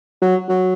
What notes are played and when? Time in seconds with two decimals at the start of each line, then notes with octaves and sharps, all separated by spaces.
0.22 F#3
0.49 F#3